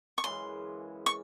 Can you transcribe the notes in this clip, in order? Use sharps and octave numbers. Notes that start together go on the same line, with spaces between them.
C#6
F#2 C#3 E3 G#3 C6
C#6